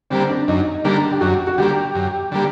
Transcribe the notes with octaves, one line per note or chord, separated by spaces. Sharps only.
D3 G3 A#3 C4
D4
F#2 D#4
D3 G3 A#3 D4
G4
F#2 F#4
F#4
D3 G3 A#3 G4
F#2
D3 G3 A#3